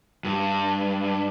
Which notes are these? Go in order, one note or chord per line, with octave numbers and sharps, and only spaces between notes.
G2